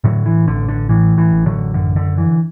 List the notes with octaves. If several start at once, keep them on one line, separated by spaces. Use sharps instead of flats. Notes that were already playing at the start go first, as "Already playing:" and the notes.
A2 D3 F#3
E3
A1 D3
D3
A2 E3
E3
A1
D3 F#3
F#2 D3
D3
D3 E3